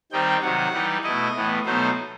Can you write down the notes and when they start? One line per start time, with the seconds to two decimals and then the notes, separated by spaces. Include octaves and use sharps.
0.12 D#3 G3 C4 D#4 G5
0.43 C3 D#3 F#3 F#5
0.73 E3 G3 D#4
1.04 B2 A3 E4 D#5
1.34 A2 E3 B3
1.65 B2 F#3 A3 D#4 C5